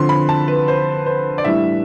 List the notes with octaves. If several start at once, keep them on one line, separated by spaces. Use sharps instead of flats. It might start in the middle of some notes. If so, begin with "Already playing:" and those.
Already playing: D3 F3 C4 C6
B5
A5
B4
C5
C5
D5
A2 E3 G3 D4 E5